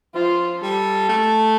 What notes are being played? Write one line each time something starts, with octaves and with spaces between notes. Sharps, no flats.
F3 F4
G3 A4
A3